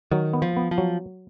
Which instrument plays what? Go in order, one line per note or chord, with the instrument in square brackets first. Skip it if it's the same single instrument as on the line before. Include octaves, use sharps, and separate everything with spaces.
[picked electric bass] D#3 [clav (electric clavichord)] F#3
[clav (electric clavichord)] B3
[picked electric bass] F3
[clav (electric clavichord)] B3
[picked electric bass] F3
[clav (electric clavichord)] F#3